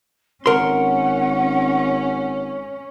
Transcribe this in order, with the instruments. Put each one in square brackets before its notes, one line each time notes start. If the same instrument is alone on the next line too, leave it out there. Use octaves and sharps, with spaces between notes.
[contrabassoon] G#1 [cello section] C#4 [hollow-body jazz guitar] A#4 C6 [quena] F#5